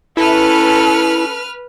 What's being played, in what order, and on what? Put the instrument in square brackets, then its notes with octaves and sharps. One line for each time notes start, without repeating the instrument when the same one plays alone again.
[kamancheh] C#4 A4 [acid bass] E4 [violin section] B4 F6